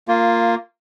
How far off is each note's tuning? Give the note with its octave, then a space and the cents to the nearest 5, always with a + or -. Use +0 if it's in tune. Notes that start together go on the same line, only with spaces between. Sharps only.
A#3 -15 F4 +0